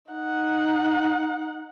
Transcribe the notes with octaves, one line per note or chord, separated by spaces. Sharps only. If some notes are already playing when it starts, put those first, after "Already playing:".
D#4 F#5